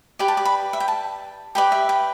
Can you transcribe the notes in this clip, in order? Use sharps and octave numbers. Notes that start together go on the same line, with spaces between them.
G4 B4 D5 G5
A5
D6
B5
E5
G5
A5
G4 B4 D5 G5
E5
G5